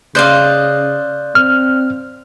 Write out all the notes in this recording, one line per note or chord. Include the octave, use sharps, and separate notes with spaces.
C#3 C5 D5 D#5 F5 F#6 G6
C4 F6